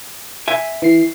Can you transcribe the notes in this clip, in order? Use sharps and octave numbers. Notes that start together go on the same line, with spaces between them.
E5 G#5
E3 C7